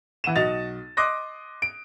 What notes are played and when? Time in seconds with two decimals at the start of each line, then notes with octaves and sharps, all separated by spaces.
0.24 E3 F#5 D#7 E7
0.35 B1 F#4 D#5 A6 F7
0.97 D#5 C6 D6 D#6 F#6 A#6
1.62 D7